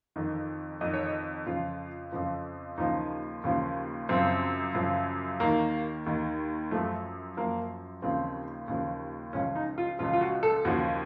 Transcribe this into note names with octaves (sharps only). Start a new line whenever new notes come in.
F2 D#3
F2 D#3 D#5
C#5
D#5
F2 C#3 F3 F4
F2 C#3 F3
D#2 C#3 F3 D#4
D#2 C#3 F3
F#2 C#3 F3 C4
F#2 C#3 F3
D#2 D#3 A#3
D#2 D#3
F#2 F3 A3
F#2 F3 A#3
D#2 C#3 F3 C4
D#2 C#3 F3
C#2 C#3 F3 C#4
D#4
F4
C#2 C#3 F3 F4
F4
F#4
A4
D#2 C#3 F3 F#4